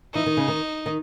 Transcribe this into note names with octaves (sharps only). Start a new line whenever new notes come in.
E3 D#4
D#3
C#3
D#3
D#3